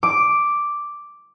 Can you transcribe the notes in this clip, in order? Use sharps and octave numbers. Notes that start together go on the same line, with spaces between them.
D6